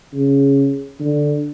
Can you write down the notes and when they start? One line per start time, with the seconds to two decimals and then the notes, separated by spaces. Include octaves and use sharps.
0.14 C#3
1.00 D3